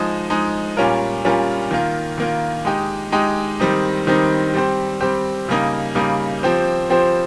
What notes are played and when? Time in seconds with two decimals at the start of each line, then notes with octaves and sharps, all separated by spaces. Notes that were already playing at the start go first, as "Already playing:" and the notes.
Already playing: F3 G#3 D#4
0.30 F3 G#3 D#4
0.77 A#2 G3 C#4 F4 A#4
1.25 A#2 G3 C#4 F4 A#4
1.71 D#3 A#3 F4
2.18 D#3 A#3 F4
2.65 G#3 D#4 G4
3.12 G#3 D#4 G4
3.60 D#3 G3 C4 D#4
4.07 D#3 G3 C4 D#4
4.54 G3 C4 G4 C5
5.01 G3 C4 G4 C5
5.49 C#3 G3 A#3 D#4
5.95 C#3 G3 A#3 D#4
6.43 F3 C4 G4 C5
6.90 F3 C4 G4 C5